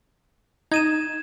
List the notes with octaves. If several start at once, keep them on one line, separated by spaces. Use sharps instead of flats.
D#4 G#6 D#7 E7